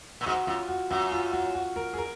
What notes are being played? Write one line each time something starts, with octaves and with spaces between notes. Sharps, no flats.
A#2
G#2 F#4
F#2 F4
F#4
F#2 F#4
F4
F#4
F#4
A#4
G#4
A#4